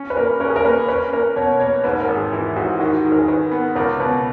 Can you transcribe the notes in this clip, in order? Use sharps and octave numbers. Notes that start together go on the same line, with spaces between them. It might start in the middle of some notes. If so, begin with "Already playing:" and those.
Already playing: C#4
B4
A#3 A#4
C#4 A#4
G#4
A#4
A#3 B4
C#4 B4
A#3 A#4
B2 C#5
A#3 C#5
G#2 B4
A#4
G#1
G#4
E3 E4
E4
G#2 F#4
D#3 F#4
D#3 G#4
A#4
G#4
D#3 B4
B3
C#2 A#4
B2 B4